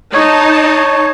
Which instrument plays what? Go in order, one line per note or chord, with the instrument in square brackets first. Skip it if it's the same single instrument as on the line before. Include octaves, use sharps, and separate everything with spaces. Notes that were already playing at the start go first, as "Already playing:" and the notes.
[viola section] D#4 A5 [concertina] C#5